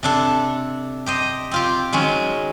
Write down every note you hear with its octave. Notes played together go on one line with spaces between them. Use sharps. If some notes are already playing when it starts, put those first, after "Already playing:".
C3 D4 A4
G4 C5 D#5
C4 F4 G4
D#3 F#3 G#3 C#4